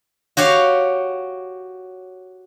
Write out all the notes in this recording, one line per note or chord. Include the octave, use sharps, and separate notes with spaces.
F#4 G4 C#5 F5